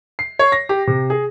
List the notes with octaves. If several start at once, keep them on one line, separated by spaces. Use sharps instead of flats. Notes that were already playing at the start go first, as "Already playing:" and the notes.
C7
C#5
A#6
G4
C3
G#4